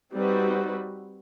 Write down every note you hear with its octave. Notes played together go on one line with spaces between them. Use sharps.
G3 C4 D#4 F#4 B4